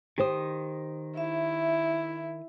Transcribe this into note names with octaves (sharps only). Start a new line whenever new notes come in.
D#3 G4 C5 D#6
E4 E5